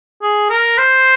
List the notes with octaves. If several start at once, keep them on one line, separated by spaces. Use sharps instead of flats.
G#4
A#4
C5